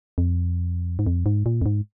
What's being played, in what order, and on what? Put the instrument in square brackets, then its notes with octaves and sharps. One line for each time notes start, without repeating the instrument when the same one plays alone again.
[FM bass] F2
G#2
F2
G#2
A#2
F2
G#2